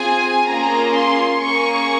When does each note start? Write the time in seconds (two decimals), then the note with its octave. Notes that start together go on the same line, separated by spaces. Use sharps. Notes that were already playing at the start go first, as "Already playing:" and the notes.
Already playing: C4 F4 G#4 G#5
0.46 A#3 C#4 F4 G#4 A#5
0.93 C6
1.42 A#3 C#4 G#4 C#6